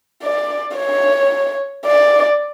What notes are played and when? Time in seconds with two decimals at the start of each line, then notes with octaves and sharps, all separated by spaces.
0.23 D5
0.77 C#5
1.86 D5